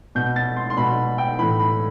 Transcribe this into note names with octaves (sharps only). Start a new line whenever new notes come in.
B2 G6
A6
C6
C6
B2 B5
G5
A2 E3 B5
B5